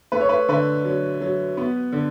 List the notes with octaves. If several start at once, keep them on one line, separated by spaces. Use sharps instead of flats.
A3 B4
C#5
B4
D3 B4
F#3
F#3
B3
D3